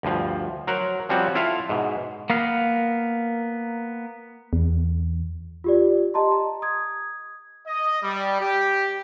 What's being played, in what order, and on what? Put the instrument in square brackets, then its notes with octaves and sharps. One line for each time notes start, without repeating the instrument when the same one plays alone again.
[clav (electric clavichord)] D2 G2 F3
F#3 A#4 C5 F#5
F3 G3 C4 C#4 F#4
E4 F4 A4 E5 F5
G#2 B2
[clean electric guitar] A#3 B3 F5
[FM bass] E2
[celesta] F4 G4 D5
G4 D#5 A5 A#5 C6
A#5
D#6 G#6
[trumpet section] D#5
G3
G4